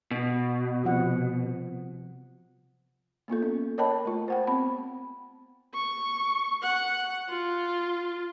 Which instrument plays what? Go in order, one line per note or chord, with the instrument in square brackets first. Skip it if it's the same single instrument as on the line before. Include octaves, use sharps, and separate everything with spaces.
[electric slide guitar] B2
[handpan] C3 F3 F#5
[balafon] A#3 B3 F4 A4
C#4
A#4 C#5 D#5 G5 A5 B5
A3 F4
C5 F#5 G5
B3 C4 B5
[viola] C#6
F#5
F4